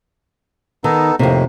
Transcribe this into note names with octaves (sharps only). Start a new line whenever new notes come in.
D#3 B3 D#4 A4
F2 A2 C3 D#3 A#3